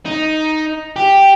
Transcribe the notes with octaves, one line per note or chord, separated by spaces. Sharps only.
D#4
G4